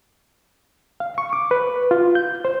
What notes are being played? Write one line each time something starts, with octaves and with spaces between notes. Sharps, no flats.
F5
C#6
D6
B4
F4
G6
C5